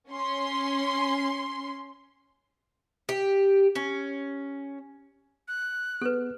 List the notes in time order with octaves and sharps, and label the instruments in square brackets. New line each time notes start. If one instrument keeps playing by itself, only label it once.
[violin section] C#4 C6
[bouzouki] G4
C#4
[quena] F#6
[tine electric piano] B3 G#4 [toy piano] A4 B4